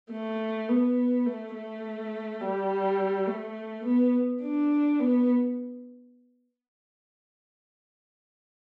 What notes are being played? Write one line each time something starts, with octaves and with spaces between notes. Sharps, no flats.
A3
B3
A3
A3
G3
A3
B3
D4
B3